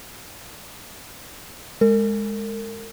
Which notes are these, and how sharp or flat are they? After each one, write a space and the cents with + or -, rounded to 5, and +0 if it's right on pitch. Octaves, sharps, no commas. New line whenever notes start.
G#3 +0 A#4 -40